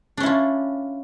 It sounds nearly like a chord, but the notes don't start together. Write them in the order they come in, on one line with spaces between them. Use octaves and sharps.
D4 C#4 E4 F4